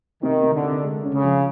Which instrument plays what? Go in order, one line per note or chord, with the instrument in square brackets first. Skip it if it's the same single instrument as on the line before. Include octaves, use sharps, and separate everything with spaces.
[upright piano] C3 [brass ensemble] D#3
[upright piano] C3
[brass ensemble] D3
[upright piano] C3
G#3
C#4
[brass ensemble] C#3
[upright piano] F3